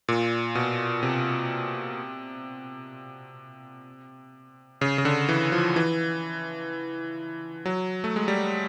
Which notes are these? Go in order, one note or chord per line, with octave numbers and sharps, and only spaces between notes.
A#2
B2
C3
C#3
C#3
D3
E3
F3
E3
F#3
A3
G#3
G3